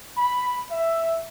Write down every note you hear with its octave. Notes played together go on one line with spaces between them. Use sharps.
B5
E5